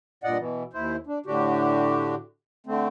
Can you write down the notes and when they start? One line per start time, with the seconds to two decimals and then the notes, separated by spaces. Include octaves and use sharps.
0.24 G2 A#2 D5 D#5 F#5
0.38 B2 E3
0.73 D#2 E4 C5
1.07 D4
1.26 A2 D3 D4 F#4 G4
2.67 D3 A3 C4